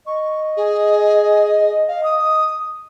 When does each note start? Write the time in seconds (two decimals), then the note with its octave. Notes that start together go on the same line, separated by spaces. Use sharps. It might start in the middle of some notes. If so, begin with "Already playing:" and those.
0.07 D#5 C#6
0.57 G#4
1.88 F5
2.04 D#6